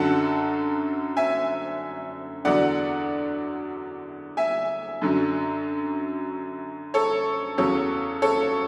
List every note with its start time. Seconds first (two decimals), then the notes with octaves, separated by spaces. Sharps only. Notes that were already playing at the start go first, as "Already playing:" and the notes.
Already playing: F#2 D3 F#3 F#5 A5
1.17 E5 G#5
2.45 E2 D3 F#3 D5 F#5
4.37 E5 G#5
5.02 F#2 D3 F#3
6.94 A4 C#5
7.58 E2 C#3 F#3 A4 C#5
8.22 A4 C#5